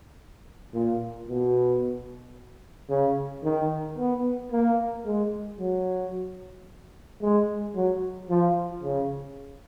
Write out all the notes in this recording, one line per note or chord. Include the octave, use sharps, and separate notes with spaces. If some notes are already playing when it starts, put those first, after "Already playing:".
A#2
B2
C#3
D#3
B3
A#3
G#3
F#3
G#3
F#3
F3
C#3